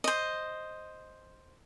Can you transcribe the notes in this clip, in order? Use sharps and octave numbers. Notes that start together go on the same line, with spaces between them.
C5 D#5